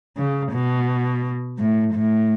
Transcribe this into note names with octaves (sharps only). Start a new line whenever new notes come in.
C#3
B2
A2
A2